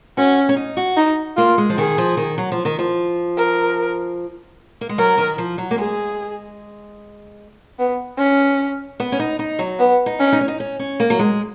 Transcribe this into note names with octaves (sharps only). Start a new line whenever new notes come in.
C#4 F#4
C#4
D#4
F#4
D#4
A#3 F4
G#3
F3
D#3 G#4
F3
D#3
F#3
F3
D#3
F3
A#4
A#3
G#3
F#3 A#4
D#3
F3
F#3
A#3
G#3 G#4
B3
C#4
B3
C#4
D#4
D#4
F#3
B3
D#4
C#4
D#4
C#4
D#4
C#4
C#4
A#3
F#3
G#3